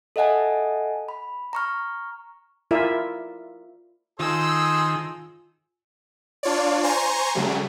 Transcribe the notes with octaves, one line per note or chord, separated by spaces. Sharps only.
A4 D#5 E5 F#5 G#5 A5
B5
A#5 C#6 F6
E4 F4 A#4 D5 E5
D#3 F4 G#4 A4 C5 G#5 E6
D4 F4 C#5 D5
C5 G#5 A#5 C6 C#6
C#3 F#3 G3 A3